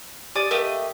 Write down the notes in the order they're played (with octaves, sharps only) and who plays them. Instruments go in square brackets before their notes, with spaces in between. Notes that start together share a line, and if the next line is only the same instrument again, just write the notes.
[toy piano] G4 [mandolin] D5 G#5 D#6
[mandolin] A3 G4 D#5 [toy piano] A#4 F5